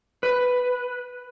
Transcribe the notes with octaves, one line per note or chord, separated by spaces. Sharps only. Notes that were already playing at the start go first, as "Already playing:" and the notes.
B4